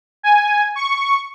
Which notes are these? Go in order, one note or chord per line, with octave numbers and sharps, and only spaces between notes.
G#5
C#6